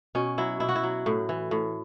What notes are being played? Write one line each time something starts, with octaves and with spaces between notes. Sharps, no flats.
B2 C#4
F#3 E4
B2 E4
F#4
E4
F#3
A2
E3
A2